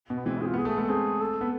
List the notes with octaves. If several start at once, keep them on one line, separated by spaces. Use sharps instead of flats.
B2
B3
E3 G#3 C4
E4
C4 G#4
F4
B3 G#4
A3 G#4
G#3 B3 A4
A3 C4 G#4
A4
B3